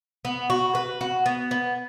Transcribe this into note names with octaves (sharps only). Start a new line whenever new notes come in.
B3
F#4
B4
F#4
B3
B3